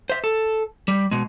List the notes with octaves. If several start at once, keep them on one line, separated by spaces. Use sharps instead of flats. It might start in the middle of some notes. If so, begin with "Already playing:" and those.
C5 E5
A4
G3
B2 G#3